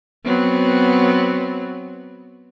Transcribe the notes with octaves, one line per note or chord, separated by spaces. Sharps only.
F#3 B3 C4